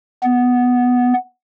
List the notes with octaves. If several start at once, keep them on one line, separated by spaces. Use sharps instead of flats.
B3